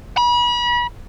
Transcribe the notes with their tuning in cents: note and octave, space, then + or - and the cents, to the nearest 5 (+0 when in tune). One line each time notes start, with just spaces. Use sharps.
B5 -35